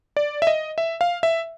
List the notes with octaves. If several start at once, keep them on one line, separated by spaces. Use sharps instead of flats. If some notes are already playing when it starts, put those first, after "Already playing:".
D5
E5
D#5
E5
F5
E5